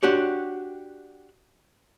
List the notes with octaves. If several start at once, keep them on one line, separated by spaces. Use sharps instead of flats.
D4 F#4 G4 C#5